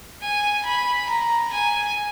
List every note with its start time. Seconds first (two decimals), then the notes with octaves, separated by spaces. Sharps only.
0.23 G#5
0.66 B5
1.09 A#5
1.53 G#5